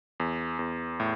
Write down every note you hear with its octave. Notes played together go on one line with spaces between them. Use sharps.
E2
E2
A2